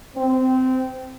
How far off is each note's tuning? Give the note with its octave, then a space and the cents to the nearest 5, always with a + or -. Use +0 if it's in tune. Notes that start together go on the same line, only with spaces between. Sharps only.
C4 -20